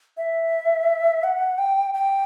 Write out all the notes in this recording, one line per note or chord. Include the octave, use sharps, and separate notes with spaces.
E5
F#5
G5
G5